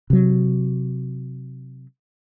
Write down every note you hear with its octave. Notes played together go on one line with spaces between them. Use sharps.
C3 F#3